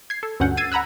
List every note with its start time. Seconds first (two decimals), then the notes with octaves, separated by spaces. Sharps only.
0.10 G#6 C7
0.23 A4
0.40 D2 G2 C#4 F#5 G6
0.57 E6 G#6 A6 C7 D#7
0.72 F#5 A#5 B5 E6 F#6